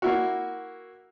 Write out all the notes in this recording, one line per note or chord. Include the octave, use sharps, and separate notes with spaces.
A#3 E4 F#4